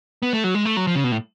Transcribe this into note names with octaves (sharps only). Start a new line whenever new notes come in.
B3
A3
F#3
G#3
A3
F#3
F3
C#3
B2
A2